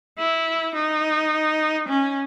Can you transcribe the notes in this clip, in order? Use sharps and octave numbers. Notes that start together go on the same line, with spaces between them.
E4
D#4
C#4